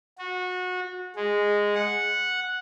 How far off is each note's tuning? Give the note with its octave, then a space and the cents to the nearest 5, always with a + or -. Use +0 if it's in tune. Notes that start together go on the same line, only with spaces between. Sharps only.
F#4 -25
G#3 -10
F#5 -10